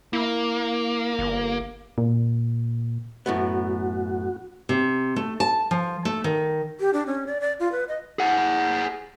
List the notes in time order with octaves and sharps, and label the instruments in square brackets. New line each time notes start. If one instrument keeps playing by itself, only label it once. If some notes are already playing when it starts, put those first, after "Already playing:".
[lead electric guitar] A#3 [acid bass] E4
[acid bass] G1
[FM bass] A#2
[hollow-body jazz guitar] F#2 A2 B3 [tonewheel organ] F#4
[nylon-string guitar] C3
A3
A5
F3
A3
D#3
[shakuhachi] G4
D4
C#4
D5
D5
F4
B4
D#5
[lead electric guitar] G#4 F#5